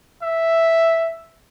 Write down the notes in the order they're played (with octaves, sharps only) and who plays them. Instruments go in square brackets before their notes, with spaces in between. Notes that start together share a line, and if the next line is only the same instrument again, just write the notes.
[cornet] E5